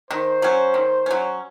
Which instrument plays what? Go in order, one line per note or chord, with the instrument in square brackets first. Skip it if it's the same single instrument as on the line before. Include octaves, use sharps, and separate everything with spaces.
[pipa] D#3 [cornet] C5
[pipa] F#3 C#4
D#3
F#3 C#4